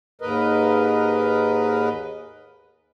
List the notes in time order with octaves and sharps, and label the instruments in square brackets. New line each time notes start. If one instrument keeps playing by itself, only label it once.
[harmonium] D#2 G#2 A#4 B4 D#5